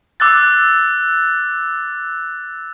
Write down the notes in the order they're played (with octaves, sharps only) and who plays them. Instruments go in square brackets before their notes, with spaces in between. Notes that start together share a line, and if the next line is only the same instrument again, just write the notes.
[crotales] D6 E6 F#6 A6